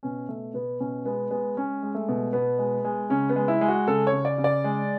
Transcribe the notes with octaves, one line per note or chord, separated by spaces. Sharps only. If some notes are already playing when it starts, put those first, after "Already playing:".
B2 C#4
B2 A3
B2 B3
B2 C#4
G#3 B3
G#3 B3
G#3 C#4
G#3
A3
B2
B2 B3
G#3
G#3
C#3 C#4
B3
G#3
E4
G#3
F#4
C#3 A4
C#5
C#3
D5
C#3
D5
G#3